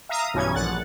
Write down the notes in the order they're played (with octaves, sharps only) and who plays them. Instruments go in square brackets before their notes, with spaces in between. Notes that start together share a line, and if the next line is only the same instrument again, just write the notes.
[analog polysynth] E5 F5 A#5 D#6
B1 G2 E3 C#4 G#6
A#1 F#5 F#6 A6